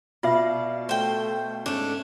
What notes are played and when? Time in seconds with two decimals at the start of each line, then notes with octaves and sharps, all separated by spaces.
0.23 B2 F4 D5 E5 F5
0.89 A3 C5 G5
1.66 G#2 A3 C#4 D4